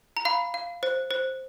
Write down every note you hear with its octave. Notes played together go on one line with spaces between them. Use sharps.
A#5
F5 B5
F5
C5
C5